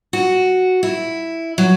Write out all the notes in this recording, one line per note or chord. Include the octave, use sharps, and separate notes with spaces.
F#4
E4
F#3